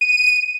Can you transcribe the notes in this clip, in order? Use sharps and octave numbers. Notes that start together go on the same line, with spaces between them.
D#7